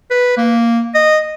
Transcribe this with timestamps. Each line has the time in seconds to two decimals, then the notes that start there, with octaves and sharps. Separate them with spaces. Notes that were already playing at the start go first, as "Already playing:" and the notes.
0.11 B4
0.38 A#3
0.95 D#5